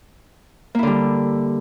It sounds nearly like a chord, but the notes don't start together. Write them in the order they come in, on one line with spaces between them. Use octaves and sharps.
A#3 E4 D3 G3